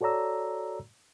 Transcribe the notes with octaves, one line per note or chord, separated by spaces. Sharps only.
F#4 A4 C#5 D5 A#5 E6